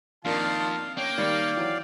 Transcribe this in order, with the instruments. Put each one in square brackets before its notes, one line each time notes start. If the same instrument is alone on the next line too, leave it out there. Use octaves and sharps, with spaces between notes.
[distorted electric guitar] F2 [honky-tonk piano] A#2 D4 A#4 [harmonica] D#3 F4 A5 [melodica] F5
[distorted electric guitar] A#3 [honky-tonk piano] C#4 [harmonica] G5
[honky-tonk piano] D#3 G3 C#7 [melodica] D5 F5
[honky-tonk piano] E3 F#3 D7